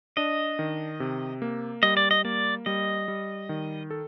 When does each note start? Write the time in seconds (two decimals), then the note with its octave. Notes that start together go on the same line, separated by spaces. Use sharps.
0.17 D4 D#5
0.59 D#3
1.00 C3
1.42 A#3
1.83 G3 D#5
1.97 D5
2.11 D#5
2.25 A#3 D5
2.66 G3 D#5
3.08 G3
3.49 D#3
3.90 A4